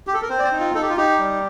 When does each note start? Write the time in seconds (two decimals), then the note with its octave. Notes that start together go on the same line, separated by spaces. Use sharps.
0.07 G4
0.14 A4
0.22 A#4
0.29 C4 C5
0.39 D5
0.44 C5
0.52 D#4
0.60 F4
0.74 D#4 A4
0.82 G4
0.89 F4
0.97 D#4 G4
1.19 G3